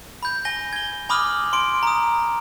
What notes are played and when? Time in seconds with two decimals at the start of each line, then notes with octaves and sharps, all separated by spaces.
0.23 B5 G6
0.45 G#5 A#6 G7
0.73 G#6 G7
1.09 G#5 B5 D6 D#6 F6 F#7
1.53 C6 D7
1.83 A#5 D#6